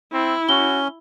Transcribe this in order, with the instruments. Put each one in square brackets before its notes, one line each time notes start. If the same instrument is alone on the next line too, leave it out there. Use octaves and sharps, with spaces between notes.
[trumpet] C4 [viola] E4
[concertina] C#4 [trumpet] F#4 [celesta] G7